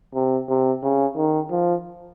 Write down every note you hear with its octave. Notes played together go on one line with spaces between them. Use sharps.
C3
C3
C#3
D#3
F3